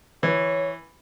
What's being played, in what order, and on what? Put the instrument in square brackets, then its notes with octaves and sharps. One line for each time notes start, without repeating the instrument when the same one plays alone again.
[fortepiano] E3 [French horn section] C#5